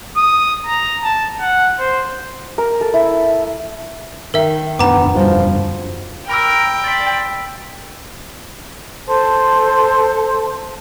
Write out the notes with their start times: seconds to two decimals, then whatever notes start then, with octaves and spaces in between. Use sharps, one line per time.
0.17 D#6
0.66 A#5
1.03 A5
1.41 F#5
1.79 C5
2.58 A#4
2.81 A4
2.94 E4
4.34 D#3 A#4 E5
4.79 E1 F#2 B3 D4 A#5 D6
5.16 F3 G3 F#4
6.29 A#4 G5 B5 D6 E6
6.84 C5 D5 A6 B6
9.08 A4 C5 A5 C6